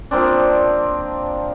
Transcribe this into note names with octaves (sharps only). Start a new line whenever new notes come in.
F3 A#3 C4 D4